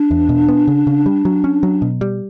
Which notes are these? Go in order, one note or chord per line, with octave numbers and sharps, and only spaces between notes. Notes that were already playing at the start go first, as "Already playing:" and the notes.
Already playing: D4
E2
B2
B3
C#3
C#3
G3
F#3
C#4
F#3
B2
G3